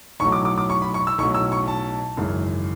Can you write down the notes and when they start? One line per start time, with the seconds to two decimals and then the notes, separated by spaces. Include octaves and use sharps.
0.20 B1 A2 F#3 C#6
0.32 D6
0.45 D6
0.58 D6
0.70 C#6
0.82 B5
0.94 C#6
1.07 E6
1.18 B1 A2 F#3 C#6
1.34 E6
1.52 C#6
1.68 A5
2.17 G#1 F#2 C#3 E3